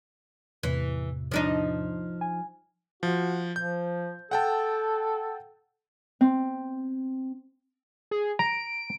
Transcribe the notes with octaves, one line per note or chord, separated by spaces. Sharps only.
E2 A2 C3 E3
F3 D4 D#4
G#5
F3 F#4
F3 G6
A4 F#5 G5 A5
C4
G#4
A#5 D7